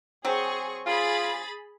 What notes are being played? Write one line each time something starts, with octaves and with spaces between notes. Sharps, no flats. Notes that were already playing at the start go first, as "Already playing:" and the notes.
F#3 C4 G#4 C#6
F4 G#4 B5 A6